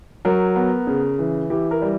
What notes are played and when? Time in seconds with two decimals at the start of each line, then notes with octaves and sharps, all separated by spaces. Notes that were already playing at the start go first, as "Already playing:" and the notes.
0.25 F#3 A#4
0.56 B3
0.87 C#3
1.19 E3
1.50 E3 G4
1.71 A#4
1.82 G3